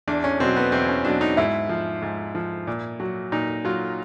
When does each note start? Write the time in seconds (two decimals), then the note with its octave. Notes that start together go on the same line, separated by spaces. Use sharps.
0.08 E2 D4
0.24 C#4
0.40 B2 F#3 C4
0.56 B3
0.72 E2 C4
0.89 C#4
1.05 B2 F#3 D4
1.21 D#4
1.37 G#2 E4
1.69 F3
2.02 G#2
2.35 F3
2.67 A#2
3.00 F#3
3.32 A#2 D#4
3.65 F#3 F4